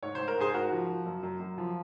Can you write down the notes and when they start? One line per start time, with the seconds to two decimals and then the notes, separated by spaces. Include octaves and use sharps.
0.03 G#2 C#5
0.15 G#2 C5
0.28 A#4
0.38 G#2 G#4 C5
0.54 G#2 F#4 A#4
0.72 F3
0.89 F3
1.06 F#2
1.23 F#2
1.40 F#2
1.58 F3